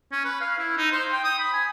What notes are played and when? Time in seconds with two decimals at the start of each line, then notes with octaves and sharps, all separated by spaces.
0.12 C#4
0.25 B4
0.41 F5
0.59 E4
0.77 D#4
0.92 C5
1.11 G5
1.24 D#6
1.38 B5
1.54 G#5